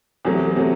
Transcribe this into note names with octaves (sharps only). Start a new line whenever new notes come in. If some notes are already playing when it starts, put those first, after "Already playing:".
E2 C3 F#3 A3
C3 F#3 A3